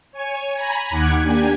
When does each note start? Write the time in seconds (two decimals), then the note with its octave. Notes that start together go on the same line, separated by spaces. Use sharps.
0.12 C#5 G#5
0.53 G#5 A#5 B5
0.90 D#2 D#3 F#5 D6 F#6 G#6
1.21 A#3 D4 G4 G#5